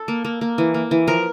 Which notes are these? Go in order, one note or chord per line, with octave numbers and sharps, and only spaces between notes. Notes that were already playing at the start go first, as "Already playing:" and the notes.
Already playing: A4
A#3
A#3
A#3
E3
A#3
E3
F3 A#4